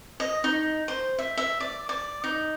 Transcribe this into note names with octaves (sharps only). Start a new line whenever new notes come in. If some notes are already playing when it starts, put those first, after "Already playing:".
D#5
D#4
C5
E5
E5
D5
D5
D#4